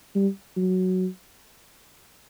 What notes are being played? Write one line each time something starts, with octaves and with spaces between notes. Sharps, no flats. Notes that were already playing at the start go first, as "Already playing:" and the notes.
G3
F#3